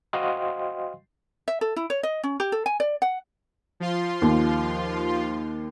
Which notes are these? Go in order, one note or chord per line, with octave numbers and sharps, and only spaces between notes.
F#4 C5 D#5 F5 G5 C6
E5
A4
E4
C#5
D#5
C#4
G4
A4
G#5
D5
F#5
F3 F4 C6
D#2